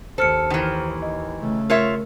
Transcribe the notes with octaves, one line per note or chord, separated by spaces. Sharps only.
D#2 A4 C5 F6 C#7
D#3 E3
D#5
C#3 A3
F4 A#4 C#5 E5